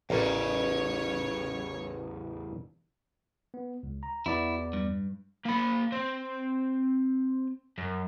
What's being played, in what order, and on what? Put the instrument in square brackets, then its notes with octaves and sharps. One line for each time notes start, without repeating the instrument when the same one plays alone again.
[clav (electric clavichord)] A1 A#4 D5 [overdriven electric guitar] E2 C#3 [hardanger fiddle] C#5
[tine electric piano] B3
C#2
A#5
[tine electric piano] E2 B3 D5 [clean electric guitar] E4 F#4
[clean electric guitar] G2
[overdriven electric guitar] A#3 B5
C4
F#2